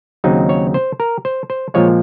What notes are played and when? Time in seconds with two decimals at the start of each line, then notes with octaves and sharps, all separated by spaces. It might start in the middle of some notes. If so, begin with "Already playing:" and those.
0.24 D#2 C#3 F#3 C4 D#4
0.49 C#5
0.74 C5
1.00 A#4
1.25 C5
1.50 C5
1.74 A#2 F3 G#3 C#5